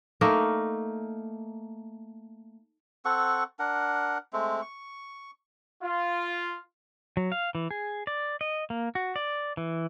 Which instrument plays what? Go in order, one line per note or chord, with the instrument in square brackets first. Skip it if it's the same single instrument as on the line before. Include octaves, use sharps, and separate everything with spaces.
[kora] A3 A#3 D#4 A#4
[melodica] C4 A4 F#5 C#6
D4 A#4 F#5
G#3 A3 C4
C#6
[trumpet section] F4
[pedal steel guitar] F#3
F5
E3
G#4
D5
D#5
A#3
F#4
D5
E3